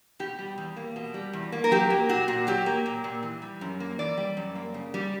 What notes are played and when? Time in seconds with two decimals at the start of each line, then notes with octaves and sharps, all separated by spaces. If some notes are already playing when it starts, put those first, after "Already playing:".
0.20 B2 G4
0.38 G3
0.58 E2
0.77 A#3
0.96 B2
1.14 G3
1.33 E2
1.52 A#3
1.64 A#4
1.71 F#3 G4
1.90 A#3
2.09 A#2 F#4
2.28 A#2
2.47 F#3 G4
2.66 A#3
2.86 A#2
3.04 A#2
3.23 E3
3.42 G3
3.61 F#2
3.80 A#3
3.99 E3 D5
4.17 G3
4.37 F#2
4.55 A#3
4.74 C#3
4.94 G3